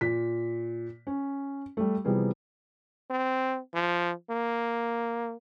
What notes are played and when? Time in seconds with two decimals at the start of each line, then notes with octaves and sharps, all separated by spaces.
0.01 A#2 B6
1.07 C#4
1.77 G3 A3
2.05 C3 E3 F3 G3 B3 G#4
3.10 C4
3.74 F3
4.30 A#3